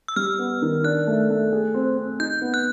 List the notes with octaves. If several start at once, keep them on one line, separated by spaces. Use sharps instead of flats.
E6
G3 F6
B3
D#3
D4 F#6
A3
A3
G#4
C4
C4
D#4 G6
B3
F#6